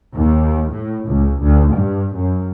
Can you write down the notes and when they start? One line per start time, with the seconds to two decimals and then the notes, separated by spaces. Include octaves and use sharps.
0.15 D#2
0.73 A2
1.08 C#2
1.42 D2
1.74 G2
2.15 F#2